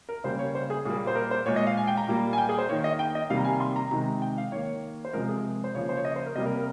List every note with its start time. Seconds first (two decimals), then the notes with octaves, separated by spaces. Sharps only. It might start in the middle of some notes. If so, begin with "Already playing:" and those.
0.09 A#4
0.24 C#3 G3 A#3 C5
0.39 C#5
0.55 C5
0.70 G#4
0.85 A#2 G3 A#3 G#4
1.07 C5
1.16 A#4
1.31 C5
1.46 A#2 G#3 C#5
1.56 D#5
1.67 F5
1.77 G#5
1.87 G5
1.97 A#5
2.07 A#2 G3 A#3
2.33 G#5
2.38 G5
2.49 G#4
2.58 C5
2.69 A#3 C#5
2.72 D#3
2.84 D#5
2.99 G5
3.15 D#5
3.30 C3 D#3 G3 A#3 F5
3.37 A#5
3.45 G#5
3.60 C6
3.76 A#5
3.91 C3 D#3 G#3 A#5
4.22 G5
4.38 F5
4.52 D#3 A#3 C#5
5.05 C5
5.13 C3 F3 G#3 A#4
5.29 G#4
5.64 C5
5.74 C#3 F3 A#3 C#5
5.89 C5
5.97 C#5
6.05 D#5
6.16 C5
6.26 A#4
6.35 C3 G3 A#3 D#5
6.46 A#4
6.57 A#4